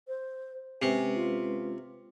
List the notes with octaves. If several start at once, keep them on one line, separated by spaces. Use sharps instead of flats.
C5
C3 G#3 C#4 B4 G#5
F4